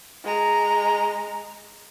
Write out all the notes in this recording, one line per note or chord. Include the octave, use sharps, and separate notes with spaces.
G#3 A#5